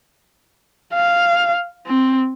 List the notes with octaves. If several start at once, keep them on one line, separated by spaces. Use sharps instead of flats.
F5
C4